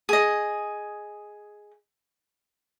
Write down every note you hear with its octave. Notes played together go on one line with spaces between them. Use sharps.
G#4 D#5